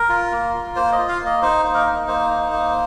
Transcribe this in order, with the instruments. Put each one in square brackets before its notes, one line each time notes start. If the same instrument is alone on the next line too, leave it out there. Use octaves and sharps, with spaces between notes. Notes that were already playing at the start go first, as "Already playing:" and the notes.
Already playing: [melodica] A#4
F4
A#3
F4
A#3 C5
D#5
F4
F5
A#3
D#5
D#4 C5
A#3
A#4
D#4
A#3 C5
D#4
A#3